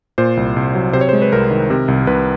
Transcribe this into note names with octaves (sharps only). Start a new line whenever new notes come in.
A#2 C5
C2
C2
F#3
C3 C5
C#5
G#3 C5
B4
C2 A#4
D#3
C3
C2
C2 B4